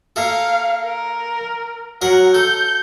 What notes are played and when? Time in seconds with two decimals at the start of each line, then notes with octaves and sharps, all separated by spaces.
0.16 A#3 A4 F5
0.85 A#4
2.02 F#3 A#4 F#5
2.35 A4 G6